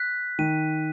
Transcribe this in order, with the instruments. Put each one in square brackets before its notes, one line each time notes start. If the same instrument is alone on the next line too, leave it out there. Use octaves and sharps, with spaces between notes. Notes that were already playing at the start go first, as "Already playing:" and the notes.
Already playing: [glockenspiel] F#6 B6
[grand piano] D#3 [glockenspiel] D#7